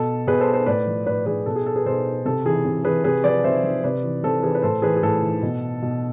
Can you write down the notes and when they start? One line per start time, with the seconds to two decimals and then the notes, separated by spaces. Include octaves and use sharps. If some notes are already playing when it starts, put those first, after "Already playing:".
Already playing: B2 A4
0.27 B2 G#4 B4
0.40 A4 C5
0.54 A4 C5
0.66 A2 B4 D5
0.87 F3
1.06 A2 B4 D5
1.26 F3 G#4 B4
1.46 B2 A4
1.56 G#4
1.66 A4
1.76 G#4 B4
1.86 B2 A4 C5
2.25 C3 A4
2.45 E3 G#4
2.65 C3
2.84 E3 G#4 B4
3.04 C3 G#4 B4
3.24 F3 B4 D5
3.44 C3 C5 E5
3.63 F3
3.84 C3 B4 D5
4.03 E3
4.23 C3 A4 C5
4.43 E3 G#4 B4
4.55 B4
4.62 A2 A4 C5
4.82 E3 G#4 B4
4.96 G#4
5.03 A2 A4
5.23 E3
5.42 B2
5.82 B2